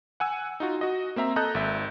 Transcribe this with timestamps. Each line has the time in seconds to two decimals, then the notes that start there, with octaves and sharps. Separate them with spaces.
0.20 F#5 G#5 E6
0.60 D#4 F4 F#4
0.81 F#4 D#5
1.16 A#3 C4 E5 A#5
1.36 A4 D#5 A#5 F#6 G6
1.54 G#1 E5